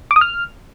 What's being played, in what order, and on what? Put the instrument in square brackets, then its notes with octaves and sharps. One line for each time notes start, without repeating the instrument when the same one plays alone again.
[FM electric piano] D6
D#6
F6